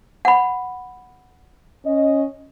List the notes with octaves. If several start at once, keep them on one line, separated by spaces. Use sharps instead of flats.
F#5 B5
C#4 D#5